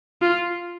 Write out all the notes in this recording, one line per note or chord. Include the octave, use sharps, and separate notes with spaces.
F4